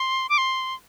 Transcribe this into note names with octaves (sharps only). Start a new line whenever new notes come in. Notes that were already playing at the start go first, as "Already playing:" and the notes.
Already playing: C6
D6
C6